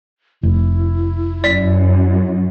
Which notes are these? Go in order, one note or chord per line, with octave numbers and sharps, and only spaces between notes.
F1 E4
F#2 D5 B6